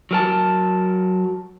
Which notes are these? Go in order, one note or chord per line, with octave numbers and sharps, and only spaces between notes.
F#3 A#4 A5